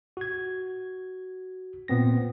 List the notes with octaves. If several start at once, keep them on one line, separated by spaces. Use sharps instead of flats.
F#4 G#6
A#2 B3 C4 A#6